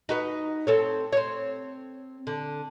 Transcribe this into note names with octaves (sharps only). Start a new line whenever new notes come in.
D#4 F#4 B4
C4 A4 C#5
C4 C#5
D3